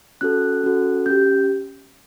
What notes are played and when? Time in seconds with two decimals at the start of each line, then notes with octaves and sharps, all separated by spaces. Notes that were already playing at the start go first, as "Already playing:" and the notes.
0.21 C#4 F#4 A4 F#6
0.64 C#4 F#4 A4
1.06 C#4 G4 G6